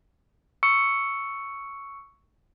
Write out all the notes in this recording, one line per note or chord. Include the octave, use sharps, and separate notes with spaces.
C#6 E6 C#7